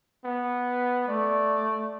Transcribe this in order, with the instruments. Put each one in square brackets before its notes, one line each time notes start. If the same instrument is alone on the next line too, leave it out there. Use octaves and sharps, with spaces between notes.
[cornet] B3
[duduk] A3 [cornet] D5